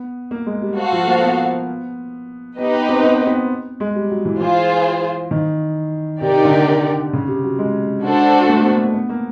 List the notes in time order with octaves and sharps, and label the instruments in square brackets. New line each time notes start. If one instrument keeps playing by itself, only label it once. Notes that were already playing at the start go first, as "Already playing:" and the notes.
Already playing: [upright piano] B3
A#3
G#3
G3
[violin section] F#4 A4 C5 F5
[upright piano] F3
A#3
B3
[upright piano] B3 [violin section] D#4 G4 B4 D#5
[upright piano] B3
C4
B3
B3
G#3
G3
F#3
E3
[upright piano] E3 [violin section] F4 G#4 C5
[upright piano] D#3
[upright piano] C3 [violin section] D#4 G4 A#4 D5
[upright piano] D3
C#3
C3
F#3
G#3
[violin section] D4 F#4 A4 C5
[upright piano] A3
B3
A#3
A#3
B3
A#3